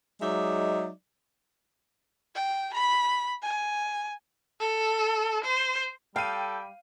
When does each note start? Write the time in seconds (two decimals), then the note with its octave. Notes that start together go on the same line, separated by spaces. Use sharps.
0.21 F#3 G#3 D#4 D5 E5
2.35 G5
2.74 B5
3.43 G#5
4.61 A4
5.45 C5
6.16 G3 A4 F5 G5 D#7